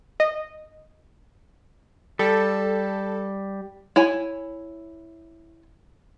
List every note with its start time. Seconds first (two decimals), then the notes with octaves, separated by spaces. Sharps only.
0.20 D#5
2.19 G3 A4
3.96 E4 C#5 G#5